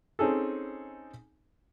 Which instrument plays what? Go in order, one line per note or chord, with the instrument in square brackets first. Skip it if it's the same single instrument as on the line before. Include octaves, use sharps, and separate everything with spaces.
[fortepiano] C4 C#4 D#4 G#4 A4